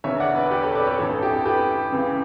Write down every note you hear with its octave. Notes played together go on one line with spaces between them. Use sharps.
E1 E2 D3 C#5 E5
D5 F#5
B4 D5
G4 B4
A4 C#5
B4 D5
A4 C#5
A1 G2 E3 A4
A4
G4
A4
G4 B4
C#2 C#3 E3